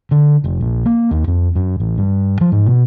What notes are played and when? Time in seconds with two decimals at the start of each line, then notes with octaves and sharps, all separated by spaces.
0.11 D3
0.44 F1
0.61 A#1
0.86 A#3
1.11 D#2
1.27 F2
1.55 F#2
1.80 A1
1.98 G2
2.41 F3
2.52 G#2
2.66 B2